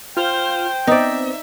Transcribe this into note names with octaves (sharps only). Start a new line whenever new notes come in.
F4 C5 G5 F6
B3 C4 D#4 C5 D5 E5